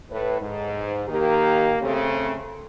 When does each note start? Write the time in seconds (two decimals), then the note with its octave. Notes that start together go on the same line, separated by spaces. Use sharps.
0.10 A2 B4
0.40 G#2
1.08 D#3 A#3 G4
1.82 C#3 A3 C4